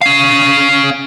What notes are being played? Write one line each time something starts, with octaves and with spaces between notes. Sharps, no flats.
C#4 F5